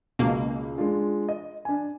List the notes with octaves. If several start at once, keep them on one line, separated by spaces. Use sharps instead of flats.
C#2 B2 A#3
G#3 D4 F4
D#5
D4 G#5